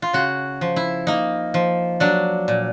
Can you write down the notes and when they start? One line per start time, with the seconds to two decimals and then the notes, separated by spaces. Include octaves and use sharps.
0.02 F4
0.13 C#3 F#4
0.61 F3
0.76 E4
1.07 A#3 D#4
1.54 F3
2.00 F#3 D4
2.48 A#2